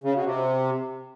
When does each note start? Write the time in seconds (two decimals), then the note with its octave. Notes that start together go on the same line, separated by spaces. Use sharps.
0.04 C#3
0.14 B2
0.25 C3